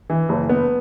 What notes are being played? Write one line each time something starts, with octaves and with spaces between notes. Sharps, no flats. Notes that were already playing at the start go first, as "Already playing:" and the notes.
E3
F#1
B3